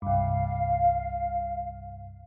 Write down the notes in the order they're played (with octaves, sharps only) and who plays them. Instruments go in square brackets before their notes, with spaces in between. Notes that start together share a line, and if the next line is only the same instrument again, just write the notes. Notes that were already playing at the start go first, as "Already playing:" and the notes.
[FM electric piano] C2 G2 [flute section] F5